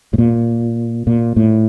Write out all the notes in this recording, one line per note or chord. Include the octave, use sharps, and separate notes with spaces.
A2
A#2
A#2
A2